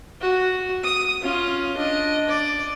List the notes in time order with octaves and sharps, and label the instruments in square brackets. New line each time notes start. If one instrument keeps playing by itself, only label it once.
[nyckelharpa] F#4
D#6
C#4 F4
D4 D#5
D5